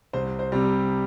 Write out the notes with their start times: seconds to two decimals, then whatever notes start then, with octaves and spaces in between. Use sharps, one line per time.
0.13 C2 C5
0.39 C5
0.52 C3 G3